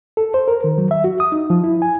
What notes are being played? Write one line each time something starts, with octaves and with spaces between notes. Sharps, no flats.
A4
C5
A#4
D#3
F#3
E5
F#4
D#6
D#4
F3
E4
G#5